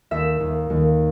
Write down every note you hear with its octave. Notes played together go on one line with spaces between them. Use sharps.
D#2 E5
D#2
D#2